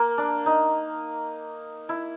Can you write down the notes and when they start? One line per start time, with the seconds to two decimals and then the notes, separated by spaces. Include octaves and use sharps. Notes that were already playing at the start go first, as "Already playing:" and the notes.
Already playing: A#3
0.18 D4
0.46 D#4
1.89 E4